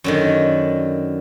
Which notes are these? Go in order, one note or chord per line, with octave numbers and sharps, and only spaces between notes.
F#2 D3 D#3